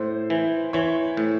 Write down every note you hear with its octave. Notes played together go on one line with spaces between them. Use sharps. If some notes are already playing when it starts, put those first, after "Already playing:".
Already playing: A2 C5
E3
E3 C#5
A2